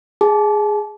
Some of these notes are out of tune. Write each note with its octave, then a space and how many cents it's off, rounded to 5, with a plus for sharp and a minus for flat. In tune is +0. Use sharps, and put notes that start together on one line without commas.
G#4 +0 A5 -35